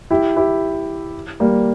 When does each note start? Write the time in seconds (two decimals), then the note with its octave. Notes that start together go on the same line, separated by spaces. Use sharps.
0.10 E4 G4
0.36 E4 G4
1.40 G3 A#3